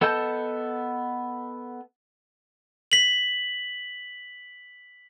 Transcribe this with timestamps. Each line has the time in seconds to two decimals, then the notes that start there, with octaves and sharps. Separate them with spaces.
0.01 B3 A4 D#5 A5 G6
2.92 B6 F#7